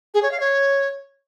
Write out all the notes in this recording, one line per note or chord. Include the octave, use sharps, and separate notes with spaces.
G#4
C#5
F5
C#5